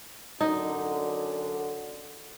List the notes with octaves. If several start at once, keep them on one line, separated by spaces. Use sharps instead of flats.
F#2 D3 D#4